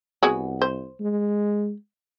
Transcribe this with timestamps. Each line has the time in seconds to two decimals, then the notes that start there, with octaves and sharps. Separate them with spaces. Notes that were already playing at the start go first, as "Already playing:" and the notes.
0.23 C2 B3 F#4 G#4
0.62 C5
1.00 G#3